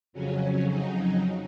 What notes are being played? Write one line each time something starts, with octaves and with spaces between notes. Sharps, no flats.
F2 C#3 F#3 C#4
D#4